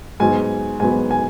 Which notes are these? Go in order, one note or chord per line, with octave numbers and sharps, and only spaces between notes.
G#2 F#3 B3 G#5
G#2 F#3 B3 G#5
G#5